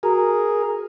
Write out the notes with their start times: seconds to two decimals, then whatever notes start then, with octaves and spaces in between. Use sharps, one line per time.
0.03 F#4 G#4 A#4 A#5